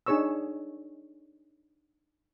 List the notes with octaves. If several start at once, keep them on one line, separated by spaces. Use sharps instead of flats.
D4 D#4 G#4 C#5 C#6 E6